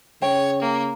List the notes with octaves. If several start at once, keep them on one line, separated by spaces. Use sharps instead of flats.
C#3 C#5 G5
A#3